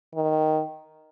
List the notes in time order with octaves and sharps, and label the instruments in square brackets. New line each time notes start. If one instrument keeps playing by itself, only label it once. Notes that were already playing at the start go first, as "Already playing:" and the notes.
[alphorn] D#3